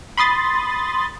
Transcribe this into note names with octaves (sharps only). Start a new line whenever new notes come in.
B5 C6 D#6 A6